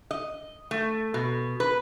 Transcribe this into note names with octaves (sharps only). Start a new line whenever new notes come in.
D#5
A3
B2
B4